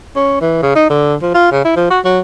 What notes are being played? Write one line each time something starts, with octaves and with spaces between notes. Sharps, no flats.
C#4
E3
C#3
D#4
D3
F3
F4
C#3
E4
F3
F#4
F#3